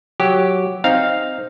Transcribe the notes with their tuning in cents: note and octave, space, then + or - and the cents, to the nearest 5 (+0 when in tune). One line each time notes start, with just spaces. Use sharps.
F#3 +0 G4 -5
C4 +0 D#4 +0 F5 +0